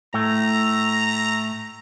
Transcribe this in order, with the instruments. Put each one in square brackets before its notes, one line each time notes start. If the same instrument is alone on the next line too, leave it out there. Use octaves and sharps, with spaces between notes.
[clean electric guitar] A2 A3 [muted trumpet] A#5